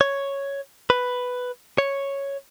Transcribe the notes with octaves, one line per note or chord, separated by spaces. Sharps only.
C#5
B4
C#5